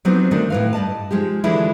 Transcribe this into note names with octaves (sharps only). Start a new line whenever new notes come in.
F3 F#3 B3 C4 D4 D#4
D3 D#3 F#3 A3 D4
A2 B4 F5
G2 D5 D#5 A5
F3 G#3 D#4 G4
D3 E3 F3 G#3 D4 E4